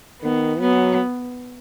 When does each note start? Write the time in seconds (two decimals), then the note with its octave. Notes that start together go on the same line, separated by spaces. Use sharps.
0.22 D#3 B3
0.60 F#3 B3